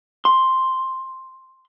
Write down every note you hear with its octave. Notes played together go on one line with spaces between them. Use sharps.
C6